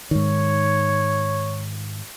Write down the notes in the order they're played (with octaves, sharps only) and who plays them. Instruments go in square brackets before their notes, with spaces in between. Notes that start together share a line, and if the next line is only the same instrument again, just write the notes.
[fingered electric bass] G#2 D#3 [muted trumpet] C#5